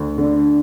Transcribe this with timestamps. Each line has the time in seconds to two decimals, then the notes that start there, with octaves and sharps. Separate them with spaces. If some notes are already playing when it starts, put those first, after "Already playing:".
Already playing: D2
0.18 D3